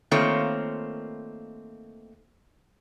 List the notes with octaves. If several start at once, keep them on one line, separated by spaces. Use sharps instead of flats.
D#3 A3 A#3 C4 F4 C#5